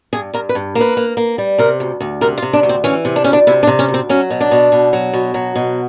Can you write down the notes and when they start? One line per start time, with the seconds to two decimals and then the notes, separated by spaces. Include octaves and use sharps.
0.13 G2 G#4
0.33 G2 A#4
0.49 B4
0.55 G2
0.75 A#3
0.81 B4
0.97 A#3
1.17 A#3
1.38 G3
1.58 C3 A#4
1.80 D2
2.00 D2
2.21 C3 A#4
2.38 F4
2.42 C3
2.53 D4
2.63 D2
2.69 C4
2.84 E3 C#4
3.05 C3
3.16 D4
3.24 D2 C#4
3.33 D4
3.47 C3 E4
3.63 D4
3.67 C3
3.79 C#4
3.88 D2
3.94 C4
4.09 F#3 C#4
4.30 B2
4.41 D4
4.51 B2
4.72 B2
4.93 F#3
5.13 B2
5.34 F#3
5.56 B2